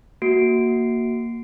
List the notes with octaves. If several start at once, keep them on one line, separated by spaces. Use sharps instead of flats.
A#3 F#4 C7 D7